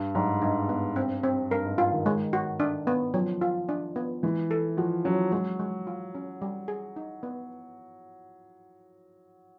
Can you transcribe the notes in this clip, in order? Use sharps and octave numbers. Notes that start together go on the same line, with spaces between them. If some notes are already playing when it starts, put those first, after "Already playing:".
Already playing: G2
G#2 F#3
G2 D#4
B3
C4
C4
G2 A#4
G#2
F4
D#3
G#3
F#4
D4
B3
F3 F#3
F4
D4
B3
E3 G#3
A4
F3 F#4
F#3 C#4
F#3 G#3
G#3
F4
C#4
G3
G#4
D#4
B3